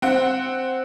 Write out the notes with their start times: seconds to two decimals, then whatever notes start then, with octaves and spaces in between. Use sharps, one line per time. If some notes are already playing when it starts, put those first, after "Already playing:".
0.02 C4 F#5